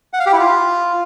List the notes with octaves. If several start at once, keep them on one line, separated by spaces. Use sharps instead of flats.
F#5
F5
G4
E4
F4